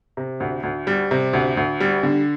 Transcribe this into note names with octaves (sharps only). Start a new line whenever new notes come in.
C3
D2
D2
G3
C3
D2
D2
G3
D3